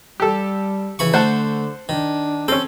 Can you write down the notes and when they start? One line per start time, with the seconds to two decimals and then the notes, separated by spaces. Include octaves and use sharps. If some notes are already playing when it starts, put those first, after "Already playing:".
0.20 G3 G4 A4
0.99 C#3 E3 B5 C#6
1.14 D3 A3 C5 F#5 A5
1.89 D#3 D4
2.48 C4 C#4 A4